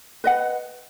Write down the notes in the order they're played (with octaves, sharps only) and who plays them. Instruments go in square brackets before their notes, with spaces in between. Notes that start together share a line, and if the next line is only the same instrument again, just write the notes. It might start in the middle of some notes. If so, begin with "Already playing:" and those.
[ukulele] B4 D#5 F#5